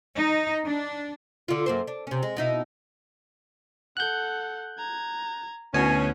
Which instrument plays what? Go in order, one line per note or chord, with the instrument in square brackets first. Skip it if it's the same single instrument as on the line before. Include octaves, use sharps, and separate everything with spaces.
[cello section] D#4
D4
[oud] D3 F4
F#2 A#3 C5
D4
C3 C#4
G#3
B2 D#4 E4
[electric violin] A4 F#5 [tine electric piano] F#6 G6
[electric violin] A#5 G#6
[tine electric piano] D2 G#5 [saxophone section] B2 C#4 [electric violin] E4 F#4